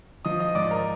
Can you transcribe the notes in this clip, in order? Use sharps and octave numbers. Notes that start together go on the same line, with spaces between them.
F3 D#5 D#6
D#5 D#6
G#2 D5 D6
A#4 A#5